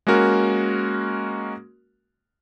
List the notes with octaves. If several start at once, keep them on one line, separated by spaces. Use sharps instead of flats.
G#3 A#3 C#4 F#4 A#4